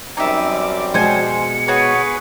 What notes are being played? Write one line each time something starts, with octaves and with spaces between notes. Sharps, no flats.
F#2 G3 C4 D#4 E5 D6
B2 G#3 C5 G#5 C#7
F#4 G#4 B4 C#5